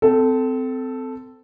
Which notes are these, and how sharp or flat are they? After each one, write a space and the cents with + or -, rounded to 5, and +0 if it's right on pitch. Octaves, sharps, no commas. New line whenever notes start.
C4 -25 A4 +0